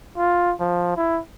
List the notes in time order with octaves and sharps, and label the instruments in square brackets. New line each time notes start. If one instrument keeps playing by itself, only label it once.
[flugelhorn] F4
F3
E4